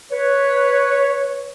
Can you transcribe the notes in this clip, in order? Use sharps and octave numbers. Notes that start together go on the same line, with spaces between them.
B4 C#5